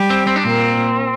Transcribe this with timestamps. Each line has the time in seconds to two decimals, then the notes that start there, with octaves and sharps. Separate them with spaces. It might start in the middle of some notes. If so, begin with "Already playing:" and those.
Already playing: G3 G4
0.10 C4
0.27 C4
0.36 D4
0.44 A#2 A#3 C4